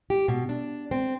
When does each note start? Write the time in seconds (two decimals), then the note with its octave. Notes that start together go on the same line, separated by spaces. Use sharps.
0.10 G4
0.28 B2
0.49 D4
0.91 C4